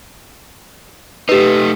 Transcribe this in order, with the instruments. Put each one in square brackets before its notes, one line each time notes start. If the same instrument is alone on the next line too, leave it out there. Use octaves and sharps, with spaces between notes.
[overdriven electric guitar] A3 D#4 [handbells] G4 B4